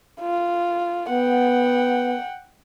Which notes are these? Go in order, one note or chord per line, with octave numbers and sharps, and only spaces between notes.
F4
B3 F#5 G5